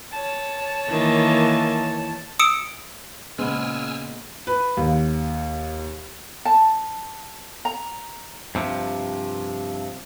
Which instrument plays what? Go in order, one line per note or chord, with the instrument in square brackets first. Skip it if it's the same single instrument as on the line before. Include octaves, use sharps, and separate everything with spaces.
[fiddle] C#5 A5
[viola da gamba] D#3 E3 A#3
[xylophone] D#6 E6 C#7 D7 E7
[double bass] A#2 [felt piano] C#3 C5 [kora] G#3 B3 [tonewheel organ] G#5 E6 F6
[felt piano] B4
D#2
[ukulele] A5
A#5
[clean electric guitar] G2 C3 F3